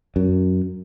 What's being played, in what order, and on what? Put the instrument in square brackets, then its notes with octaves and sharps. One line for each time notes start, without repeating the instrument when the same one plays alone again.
[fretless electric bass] F#2